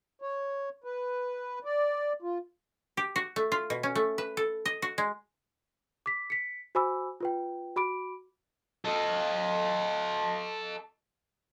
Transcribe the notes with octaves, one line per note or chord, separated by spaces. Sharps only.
C#5
B4
D5
F4
G4
F#4
A3
F4
B2
C#4
A3
B4
A4
D#5
F#4
G#3
D6 B6
B6 C#7
F#4 C5 G#5 B5 D6 E6
F4 B4 G5
F#4 B5 D6 D7
A4 D#5